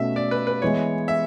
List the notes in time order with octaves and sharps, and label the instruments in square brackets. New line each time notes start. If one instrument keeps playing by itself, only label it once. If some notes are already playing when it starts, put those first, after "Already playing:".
Already playing: [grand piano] B2 A3 C#4 F#4 [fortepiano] E5
[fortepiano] D5
B4
B4
[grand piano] E3 G#3 B3 E4 [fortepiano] C#5
[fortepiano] E5